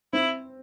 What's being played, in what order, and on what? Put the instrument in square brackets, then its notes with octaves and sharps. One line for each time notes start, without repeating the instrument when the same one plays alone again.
[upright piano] C4 [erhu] E4